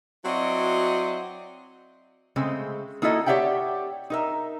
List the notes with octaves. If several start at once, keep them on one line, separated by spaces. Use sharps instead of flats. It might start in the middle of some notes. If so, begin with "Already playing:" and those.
F#3 C4 E4 F#4 D5 D#5
C#3 G#3 A3 C4
A#3 D#4 E4 F#4 A4 D#5
G4 C#5 D5 E5 F#5 G5
D#4 A#4 E5